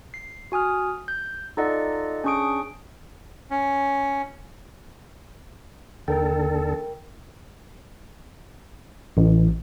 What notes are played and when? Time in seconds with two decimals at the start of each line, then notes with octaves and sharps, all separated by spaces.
0.14 C7
0.52 F#4 G#5 D#6 F6
1.08 G6
1.57 D#4 F4 A4 D5 D#5 F#5
2.24 C#4 D4 G#4 C#6 D#6 D7
3.51 C#4
6.08 D#2 D3 A4 A#4 G5
9.17 A1